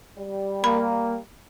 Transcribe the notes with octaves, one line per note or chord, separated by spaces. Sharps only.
G3
A#3 B5